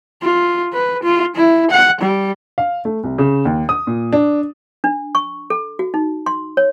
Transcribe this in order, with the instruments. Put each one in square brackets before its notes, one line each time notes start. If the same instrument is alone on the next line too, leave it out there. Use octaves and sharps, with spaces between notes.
[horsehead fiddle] F4
B4
F4
E4
F#5
G3
[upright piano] F5
A3
C2
C#3
D#2
D#6
A#2
D4
[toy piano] D4
C#6
A4
F#4
D#4
C6
C#5